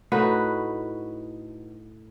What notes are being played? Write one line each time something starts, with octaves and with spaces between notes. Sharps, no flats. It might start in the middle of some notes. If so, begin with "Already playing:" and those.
A2 D#4 F#4 B4